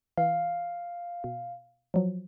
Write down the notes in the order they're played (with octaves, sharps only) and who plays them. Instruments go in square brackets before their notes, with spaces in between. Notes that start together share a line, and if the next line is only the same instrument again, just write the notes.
[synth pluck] E3 [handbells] F5
[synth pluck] B2
F3 F#3